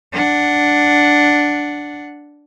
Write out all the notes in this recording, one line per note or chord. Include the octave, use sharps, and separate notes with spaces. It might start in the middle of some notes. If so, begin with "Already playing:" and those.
D4 F#5